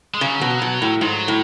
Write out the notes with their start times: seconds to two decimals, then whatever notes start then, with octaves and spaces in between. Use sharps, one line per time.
0.14 G#3
0.21 C#3 F#3
0.41 B2
0.62 B2
0.82 A2
1.01 G#2 F#3
1.28 A2